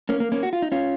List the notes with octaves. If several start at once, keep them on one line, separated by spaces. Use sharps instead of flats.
A#3 C#4
A#3
A#3 C#4
F#4
F4
D#4
C#4 F4